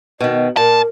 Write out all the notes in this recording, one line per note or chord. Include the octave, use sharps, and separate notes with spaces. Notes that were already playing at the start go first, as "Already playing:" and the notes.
B2 D#3 D#5
A#2 A#4 A5